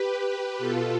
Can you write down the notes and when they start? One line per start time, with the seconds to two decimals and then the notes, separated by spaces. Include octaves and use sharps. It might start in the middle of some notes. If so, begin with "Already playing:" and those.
Already playing: G4 B4
0.58 B2 F4 A4